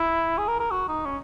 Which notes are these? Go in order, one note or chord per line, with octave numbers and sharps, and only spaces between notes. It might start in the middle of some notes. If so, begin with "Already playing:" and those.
Already playing: E4
G#4
A#4
A#4
F#4
D#4
C#4